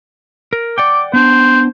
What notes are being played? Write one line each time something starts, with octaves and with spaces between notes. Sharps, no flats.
A#4
D5 F#5 G5 D6
B3 D4 C5